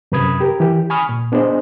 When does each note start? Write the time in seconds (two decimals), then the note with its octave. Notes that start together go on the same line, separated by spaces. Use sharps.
0.12 F#2 C3 B4 B5 D#6 G#6
0.40 G4 A#4
0.60 E3 G4
0.90 G#5 B5 C#6 D#6 F6
1.09 A#2
1.32 B3 D4 G#4 C5 D5 D#5